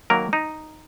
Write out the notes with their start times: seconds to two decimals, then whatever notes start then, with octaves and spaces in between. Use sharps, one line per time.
0.10 D#3 F#3 A#3 A#4
0.33 D#4